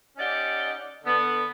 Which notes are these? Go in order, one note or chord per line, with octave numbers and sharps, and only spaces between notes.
C#4 D#4 G4 D5 F#5
D3 B3